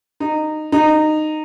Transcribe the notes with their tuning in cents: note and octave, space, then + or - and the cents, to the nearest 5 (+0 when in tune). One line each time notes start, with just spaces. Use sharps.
D#4 -15
D#4 -15